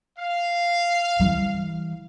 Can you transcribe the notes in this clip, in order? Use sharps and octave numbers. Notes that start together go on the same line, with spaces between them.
F5
E3 G3